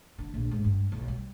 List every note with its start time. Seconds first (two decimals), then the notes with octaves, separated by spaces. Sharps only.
0.18 D3
0.34 A#1
0.51 G#2
0.64 G2
0.92 B1
1.08 G3